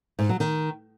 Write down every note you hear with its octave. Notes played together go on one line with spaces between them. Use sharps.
G#2
F#3
D#3